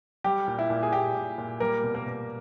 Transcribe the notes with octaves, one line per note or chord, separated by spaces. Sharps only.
G3 G4
A#2
E4
A#2
G#4
A#2 G4
A#2
A#2
G3 A#3 A#4
B2
A#3 A#4
B2